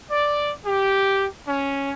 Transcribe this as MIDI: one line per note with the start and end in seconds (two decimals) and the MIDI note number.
0.11 0.50 74
0.64 1.26 67
1.46 1.92 61